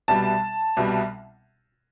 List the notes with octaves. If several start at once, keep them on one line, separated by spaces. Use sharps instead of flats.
C2 B2 G3 A5
C2 B2 G3